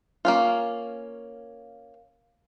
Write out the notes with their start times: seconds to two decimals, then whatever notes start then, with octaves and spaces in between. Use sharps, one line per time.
0.25 A#3 C#4 F4